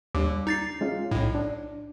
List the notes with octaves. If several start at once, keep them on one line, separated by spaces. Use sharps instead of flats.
D#2 G3 D4 D6
D#4 A6 C7
G#3 C#4 F4
B1 A2 D#4
D4